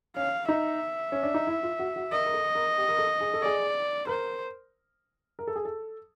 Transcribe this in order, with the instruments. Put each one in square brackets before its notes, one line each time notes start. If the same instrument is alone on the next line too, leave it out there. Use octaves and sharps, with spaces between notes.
[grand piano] C#4 [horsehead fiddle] F5
[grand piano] D#4 [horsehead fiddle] E5
[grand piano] C#4
D4
D#4
E4
F4
F#4
F#4
[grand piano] A#4 [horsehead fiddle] D#5
[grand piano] A#4
A4
A#4
G4
A#4
A4
G#4
A4
[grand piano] G#4 [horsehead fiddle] D5
[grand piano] A#4 [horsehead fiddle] C5
[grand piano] A#4
A4
G#4
A4